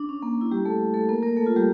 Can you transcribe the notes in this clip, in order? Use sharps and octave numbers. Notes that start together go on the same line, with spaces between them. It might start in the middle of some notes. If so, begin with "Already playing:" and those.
Already playing: D4
C#4
A#3
E4
G3 G4
A3 A4
A3 A4
A#3 A#4
A#3 A#4
A3 A4
F4
G3 G4